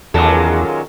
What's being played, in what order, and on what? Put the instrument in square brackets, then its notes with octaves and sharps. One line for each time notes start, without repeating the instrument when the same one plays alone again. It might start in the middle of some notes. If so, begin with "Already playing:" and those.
[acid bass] E2 [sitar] A#2 F#3 G#3 [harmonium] D#3 C#4 F4 [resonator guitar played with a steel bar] A4